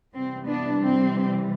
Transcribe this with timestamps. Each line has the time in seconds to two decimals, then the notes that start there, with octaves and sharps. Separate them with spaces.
0.14 C3 E3 G3 C4
0.47 B3 D4
0.80 C4